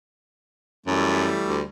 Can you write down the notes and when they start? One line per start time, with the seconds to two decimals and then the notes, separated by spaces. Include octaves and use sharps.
0.87 F#2 E3 G3 A3
1.47 D2